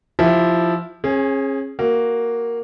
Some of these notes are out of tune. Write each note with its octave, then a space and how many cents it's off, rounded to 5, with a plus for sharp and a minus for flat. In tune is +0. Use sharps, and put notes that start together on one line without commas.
F3 +0 E4 +0 G4 +0
C#4 -35 G#4 +0
A#3 +0 F#4 +0